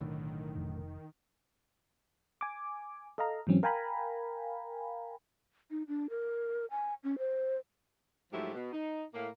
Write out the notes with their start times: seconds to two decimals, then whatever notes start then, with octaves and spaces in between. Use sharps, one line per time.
0.01 B1 A2 D3 D#3
0.56 F1
2.41 G#5 D6
3.18 A4 D#5 F5 A#5
3.47 G#2 E3 F#3 C4 C#4
3.63 A#4 F5 G5 G#5 A#5 B5
5.71 D#4
5.88 D4
6.10 A#4
6.71 G#5
7.04 C#4
7.19 C5
8.32 G#2 F3 F#3 A3 E4 G4
8.54 B2
8.72 D#4
9.14 A2 A#3